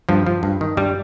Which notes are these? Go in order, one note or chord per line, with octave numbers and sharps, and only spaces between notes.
G2 F3
F3
G2
D#3
G2 G3